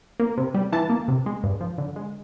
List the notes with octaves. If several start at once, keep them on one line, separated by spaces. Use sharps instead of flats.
A#3
C3
G3
E3 A5
A#3
C3
G#3
G2
F3
D3
G#3